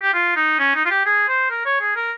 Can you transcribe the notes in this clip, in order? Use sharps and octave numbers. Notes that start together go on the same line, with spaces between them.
G4
F4
D#4
C#4
D#4
F4
G4
G#4
C5
A#4
C#5
G#4
A#4